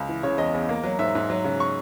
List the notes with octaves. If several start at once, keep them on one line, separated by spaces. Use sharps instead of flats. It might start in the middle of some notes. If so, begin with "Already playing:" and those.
Already playing: C#2
E3
C#3 C#5
E2 D#5
E2
A#3
F#3
G#2 E5
G#2
F#3
C#3
C#6